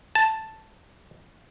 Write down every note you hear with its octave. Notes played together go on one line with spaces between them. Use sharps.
A5